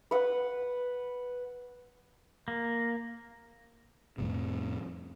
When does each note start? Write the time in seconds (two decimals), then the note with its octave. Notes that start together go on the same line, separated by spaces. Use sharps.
0.11 B4 F#5
2.48 A#3
4.18 F2 A2 C3